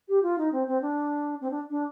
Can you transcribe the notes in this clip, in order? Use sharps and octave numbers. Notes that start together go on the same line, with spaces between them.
G4
F4
D#4
C4
C4
D4
C4
D4
D4